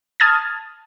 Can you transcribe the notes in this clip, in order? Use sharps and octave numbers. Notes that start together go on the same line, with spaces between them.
A5 D#6 F6 G#6 A6